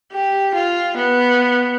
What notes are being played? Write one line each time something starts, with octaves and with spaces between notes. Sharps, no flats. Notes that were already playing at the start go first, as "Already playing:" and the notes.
G4
F4
B3